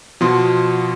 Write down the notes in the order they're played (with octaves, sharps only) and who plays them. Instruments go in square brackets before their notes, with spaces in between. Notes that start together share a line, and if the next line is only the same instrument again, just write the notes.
[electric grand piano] B2 F3 C6